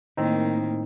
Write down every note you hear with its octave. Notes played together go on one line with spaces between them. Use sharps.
A2 D#3 A#3 C4 D#4